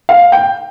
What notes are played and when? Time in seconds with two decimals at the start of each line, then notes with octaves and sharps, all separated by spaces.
0.09 F5
0.32 G5